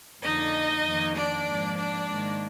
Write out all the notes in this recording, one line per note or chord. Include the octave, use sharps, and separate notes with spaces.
F2 D3 F3 A#3 D#4 D#5
F2 D#3 A#3
D4 D5
G#2 F3 A#3
D4 D5
G#2 D#3 A#3